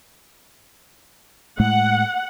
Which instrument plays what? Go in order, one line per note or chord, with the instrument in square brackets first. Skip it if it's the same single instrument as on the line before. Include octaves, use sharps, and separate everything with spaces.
[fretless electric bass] A2 G#3 A3 [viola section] F#5